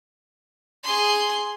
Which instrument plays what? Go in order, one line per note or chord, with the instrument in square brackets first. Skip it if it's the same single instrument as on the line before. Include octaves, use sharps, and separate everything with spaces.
[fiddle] G#4 C6